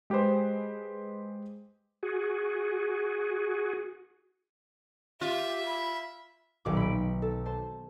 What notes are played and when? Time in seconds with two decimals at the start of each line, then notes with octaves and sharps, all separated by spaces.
0.10 G#3 G4 G#4 B4 C5
2.03 F#4 G#4
5.21 F4 G4 E5
5.66 B5
6.65 D#1 B1 D6
6.77 B5 D7
7.22 A4
7.46 C5 A5